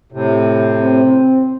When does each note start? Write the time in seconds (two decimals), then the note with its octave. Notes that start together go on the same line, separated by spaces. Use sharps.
0.12 A2 C3
0.82 C4